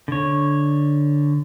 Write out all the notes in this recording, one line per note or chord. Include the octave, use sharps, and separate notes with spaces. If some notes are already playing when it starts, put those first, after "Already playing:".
D3 C#5